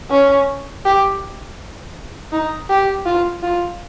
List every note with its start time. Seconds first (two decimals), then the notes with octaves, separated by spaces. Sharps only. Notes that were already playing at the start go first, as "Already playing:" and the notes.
0.10 C#4
0.85 G4
2.32 D#4
2.69 G4
3.05 F4
3.43 F4